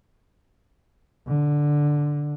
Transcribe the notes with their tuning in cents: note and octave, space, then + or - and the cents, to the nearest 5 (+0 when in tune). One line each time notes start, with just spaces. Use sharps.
D3 +0